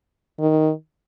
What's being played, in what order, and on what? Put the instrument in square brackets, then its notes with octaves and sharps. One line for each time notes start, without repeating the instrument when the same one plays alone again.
[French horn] D#3